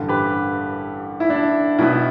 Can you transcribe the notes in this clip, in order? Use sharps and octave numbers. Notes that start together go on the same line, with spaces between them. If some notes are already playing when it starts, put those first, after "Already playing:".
Already playing: A1 G2 D3
G4 B4
E4
D4
B1 B2 E4